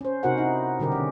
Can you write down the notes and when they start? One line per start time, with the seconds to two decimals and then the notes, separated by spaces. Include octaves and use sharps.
0.01 C#4 C5
0.23 C3 D#4 F#4 A#4 C5 F#5
0.38 D#4 E4
0.79 B2 D3 G3 G4 A#4
0.92 D#3 C#4